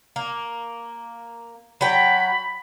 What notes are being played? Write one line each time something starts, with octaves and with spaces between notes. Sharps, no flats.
A#3
F#3 G5 B5